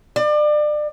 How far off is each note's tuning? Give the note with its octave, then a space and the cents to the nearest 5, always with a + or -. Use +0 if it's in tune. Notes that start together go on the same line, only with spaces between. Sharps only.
D5 +30